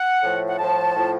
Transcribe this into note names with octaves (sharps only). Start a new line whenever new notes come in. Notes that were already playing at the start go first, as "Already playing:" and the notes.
Already playing: F#5
A2 F3
F#5
A2 F3 A5
A2 F3